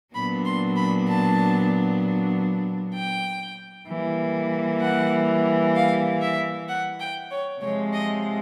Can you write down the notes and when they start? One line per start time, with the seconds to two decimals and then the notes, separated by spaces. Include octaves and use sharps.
0.14 A#2 F#3 B3 D4 B5
0.46 C6
0.76 B5
1.08 A5
2.94 G5
3.88 E3 G3 A#3
4.81 F#5
5.75 F5
6.22 E5
6.68 F#5
6.99 G5
7.31 C#5
7.61 C3 F3 G#3 C#5
7.93 D#5